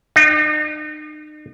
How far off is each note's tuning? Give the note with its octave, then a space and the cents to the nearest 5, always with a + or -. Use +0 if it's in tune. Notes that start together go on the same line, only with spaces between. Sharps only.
D#4 -40